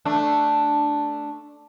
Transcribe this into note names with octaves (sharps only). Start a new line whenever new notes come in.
A3 D4